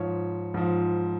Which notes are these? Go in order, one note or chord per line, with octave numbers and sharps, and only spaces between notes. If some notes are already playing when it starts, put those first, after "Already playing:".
Already playing: G#2 F3 C#5
G#2 F3